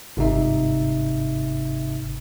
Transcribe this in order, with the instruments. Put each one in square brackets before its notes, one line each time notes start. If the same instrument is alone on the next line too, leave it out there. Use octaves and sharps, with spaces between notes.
[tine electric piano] G1 G#2 C3 D#4 E5